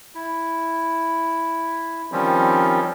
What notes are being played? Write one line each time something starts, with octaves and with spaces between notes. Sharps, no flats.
E4
D#3 F3 G3 C4 C#4